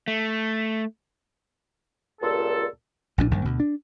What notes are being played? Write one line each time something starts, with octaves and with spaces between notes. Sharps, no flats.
A3
C#2 G2 A#2 A4
A#1 A2 C#4 D4
A#1 G2 D#3
D2 B2
D4